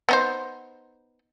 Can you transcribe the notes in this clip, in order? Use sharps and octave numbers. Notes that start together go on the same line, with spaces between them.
B3 D#4 C5